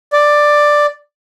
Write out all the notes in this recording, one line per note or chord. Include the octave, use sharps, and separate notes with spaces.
D5